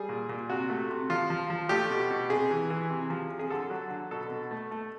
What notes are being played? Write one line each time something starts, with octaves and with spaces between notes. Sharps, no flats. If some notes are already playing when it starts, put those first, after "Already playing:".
Already playing: G3 G#4
A#2
A#2
C3 F#4
A3
C3
F3 F4
F3
F3
A3 G4
B2
B2
C3 G#4
E3
E3
C3
F3
C3
G#4
D3 A4
F#3
D3
B2 A4
B2
A3
A3